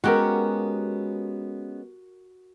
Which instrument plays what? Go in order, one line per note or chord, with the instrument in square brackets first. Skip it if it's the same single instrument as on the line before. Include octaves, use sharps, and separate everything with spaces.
[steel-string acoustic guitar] G#3 B3 C#4 [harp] F#4 G4 A#4